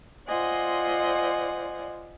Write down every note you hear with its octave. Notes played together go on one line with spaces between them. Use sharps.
F4 C5 D5 D#5 F#5 G#5